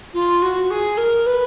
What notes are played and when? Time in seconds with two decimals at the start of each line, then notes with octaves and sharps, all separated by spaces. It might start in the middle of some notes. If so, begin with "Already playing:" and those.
0.13 F4
0.42 F#4
0.70 G#4
0.97 A#4
1.26 B4